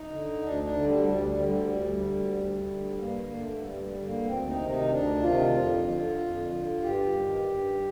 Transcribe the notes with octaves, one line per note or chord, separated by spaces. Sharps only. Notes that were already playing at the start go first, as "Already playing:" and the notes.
Already playing: D#4
D3
D2 D4
D4
D3
G3
D2 G3
G3
D3
G3
D2
D3
D2
D3
G2 A#3
A#3
D3
A3
A3
G2 G3
G3
D3
A#3
D2 C4
D#4
C3 D#3
D#4
D2 D4
C3 D#3 F4
F2
D3
F2
D3
G2 G4
D#3
G2